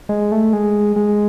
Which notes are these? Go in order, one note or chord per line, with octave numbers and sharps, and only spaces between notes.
G#3
A3
G#3
G#3